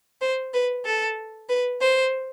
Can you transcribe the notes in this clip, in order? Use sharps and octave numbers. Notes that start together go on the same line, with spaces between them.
C5
B4
A4
B4
C5